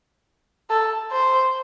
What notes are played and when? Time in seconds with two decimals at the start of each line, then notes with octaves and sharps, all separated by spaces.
0.70 A4
1.12 C5